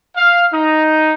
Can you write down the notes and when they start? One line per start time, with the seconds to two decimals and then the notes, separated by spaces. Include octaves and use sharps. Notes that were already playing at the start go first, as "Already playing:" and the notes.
0.16 F5
0.53 D#4